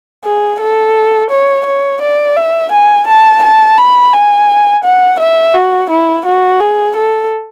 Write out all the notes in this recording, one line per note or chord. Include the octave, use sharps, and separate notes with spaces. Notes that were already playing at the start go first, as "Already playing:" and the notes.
G#4
A4
C#5
C#5
D5
E5
G#5
A5
A5
B5
G#5
F#5
E5
F#4
E4
F#4
G#4
A4